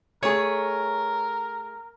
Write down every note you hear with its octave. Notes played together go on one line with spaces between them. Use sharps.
A3 G#4 A#4 C#5